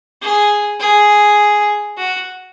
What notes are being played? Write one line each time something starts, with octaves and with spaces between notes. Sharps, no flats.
G#4
G#4
F#4